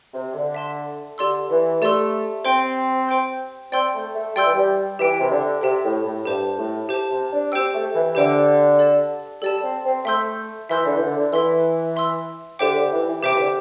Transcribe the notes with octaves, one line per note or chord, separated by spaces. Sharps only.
C3
D3
E5 A5 C6
D3 G4 D5 C6 E6
E3
A3 G4 D5 C6 E6
C4 C5 G5 C6 G6
C5 G5 C6 G6
C4 D5 G5 C6 E6 G6
A3
A3
G3 D5 G5 C6 E6 G6
E3
G3
E3 G4 E5 G5
C3
D3
C3 G4 E5 G5
A2
A2
G2 G4 C5 A5
A2
G4 C5 A5
C3
D4
C4 G4 C5 G5 E6
A3
E3
D3 G4 C5 G5 E6
A4 D5 A5
G3 A4 D5 A5
C4
C4
A3 E5 C6 E6 G6
E3 E5 C6 E6 G6
D3
E3
D3
D3
E3 E5 C6 E6
E5 C6 E6
D3 G4 C5 E5 G5 D6
D3
E3
E3
C3 G4 C5 E5 G5 D6
E3
D3